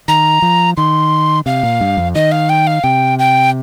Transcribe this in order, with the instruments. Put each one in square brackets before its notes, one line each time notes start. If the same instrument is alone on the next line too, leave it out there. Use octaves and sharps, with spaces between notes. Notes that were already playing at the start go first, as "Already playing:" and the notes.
[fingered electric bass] D#3 [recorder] A#5
[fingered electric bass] F3
[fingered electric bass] D#3 [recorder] C6
[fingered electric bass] C3 [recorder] F5
[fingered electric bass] A#2
G2
F2
[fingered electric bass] D#3 [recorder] D#5
[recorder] F5
G5
F5
[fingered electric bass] C3 [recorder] G5
[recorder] G5